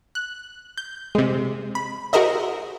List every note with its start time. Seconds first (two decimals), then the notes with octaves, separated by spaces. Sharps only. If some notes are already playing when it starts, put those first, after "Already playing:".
0.15 F#6
0.78 G6
1.15 C3 G#3
1.75 B5
2.13 F#4 G#4 A#4 C5 D#5 E5